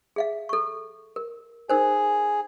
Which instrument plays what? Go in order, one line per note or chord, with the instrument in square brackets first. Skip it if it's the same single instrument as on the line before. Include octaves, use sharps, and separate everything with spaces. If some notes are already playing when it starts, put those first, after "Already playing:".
[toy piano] G#4 E5 F5
A4 C#6
A#4
[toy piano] D#4 A#4 C5 [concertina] G#4